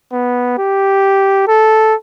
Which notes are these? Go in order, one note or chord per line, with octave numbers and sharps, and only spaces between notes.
B3
G4
A4